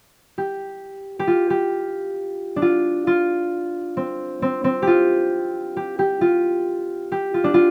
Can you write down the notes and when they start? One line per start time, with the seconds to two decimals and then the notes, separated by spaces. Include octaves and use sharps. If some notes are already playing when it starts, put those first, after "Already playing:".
0.38 G4
1.19 G4
1.27 F4
1.50 G4
2.56 D4
2.62 F4
3.07 F4
3.97 C4
4.42 C4
4.64 C4
4.82 F4 G4
5.77 G4
5.99 G4
6.21 F4
7.12 G4
7.34 F4
7.44 D4
7.54 F4